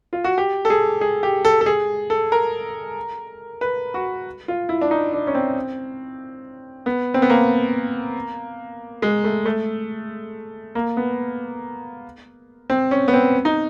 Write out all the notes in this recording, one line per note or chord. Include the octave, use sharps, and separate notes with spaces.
F4
F#4
G4
A4
G#4
G#4
G4
A4
A4
G#4
A4
A#4
B4
F#4
F4
E4
D4
D#4
D4
C#4
C4
B3
C4
B3
A#3
G#3
A3
A3
A#3
B3
C4
C#4
B3
C4
D#4